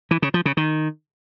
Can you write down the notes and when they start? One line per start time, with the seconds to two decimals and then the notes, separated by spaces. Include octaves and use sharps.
0.11 E3
0.22 C#3
0.34 F3
0.45 C#3
0.57 D#3